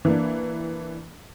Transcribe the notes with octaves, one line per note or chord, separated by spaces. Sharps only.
E3 A#3 D4